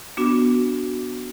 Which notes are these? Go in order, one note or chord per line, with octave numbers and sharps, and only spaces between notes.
B3 D4 F#4